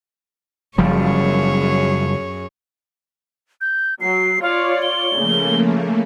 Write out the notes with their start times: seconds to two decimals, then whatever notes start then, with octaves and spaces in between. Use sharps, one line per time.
0.78 F#1 F#2 F3 G3 G#4 C#5
3.61 G6
4.01 F#3 C7
4.42 F4 C#5 D5 F5
4.82 G7
5.15 C#3 F3 A3 A#3